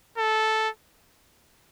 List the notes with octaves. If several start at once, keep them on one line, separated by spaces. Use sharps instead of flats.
A4